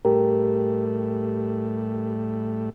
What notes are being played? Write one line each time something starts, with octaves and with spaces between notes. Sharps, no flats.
A2 G3 A3 G4 A#4